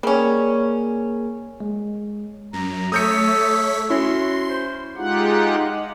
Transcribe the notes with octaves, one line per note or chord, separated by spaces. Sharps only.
G3 A#3 C#4 G#4 A#4
G#3
F#2 A#5
A3 A4 C#5 D#6 G6 B6 C#7
C#4 E4 F#4 C6
C5
G#3 D#4 F4 G4 F#5